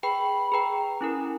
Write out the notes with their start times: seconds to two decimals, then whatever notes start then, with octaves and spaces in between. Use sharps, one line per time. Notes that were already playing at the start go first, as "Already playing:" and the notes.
0.03 G#4 B4 G5 B5
0.52 G#4 B4 G5 A#5
1.01 C#4 E4 A#4 G#5